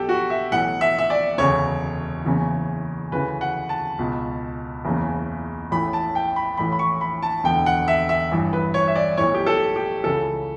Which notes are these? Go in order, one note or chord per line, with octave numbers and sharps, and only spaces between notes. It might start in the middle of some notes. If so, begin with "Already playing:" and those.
Already playing: B1 B2 G4 A4
F#4
E5
B1 A2 E3 F#5
E5
E5
D5
E1 D2 C#3 C#5
F#1 E2 C#3 E3
D2 C#3 E3 B4
F#5
A5
C#2 B2
F#1 E2 C#3
A1 A2 E3 B5
A5
G5
B5
A1 A2 E3 B5
B5
C#6
B5
A5
E1 D2 D3 G5
F#5
E5
E5
A1 G2 E3
B4
C#5
E5
D5
B1 A2 E3 C#5
G4
A4
G4
C#2 C#3 E3 A4